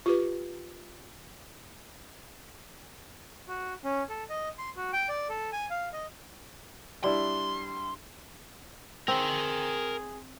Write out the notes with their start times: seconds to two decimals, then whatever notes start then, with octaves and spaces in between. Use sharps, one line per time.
0.06 F4 G4 B4
3.48 F#4
3.84 C#4
4.10 A4
4.30 D#5
4.58 C6
4.76 F#4
4.93 G5
5.09 D5
5.29 A4
5.52 G#5
5.70 F5
5.93 D#5
7.04 G3 D4 E4 C6
9.08 C4 G#4 A#4 G5